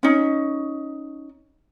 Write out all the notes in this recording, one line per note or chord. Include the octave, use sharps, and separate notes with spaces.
C#4 D#4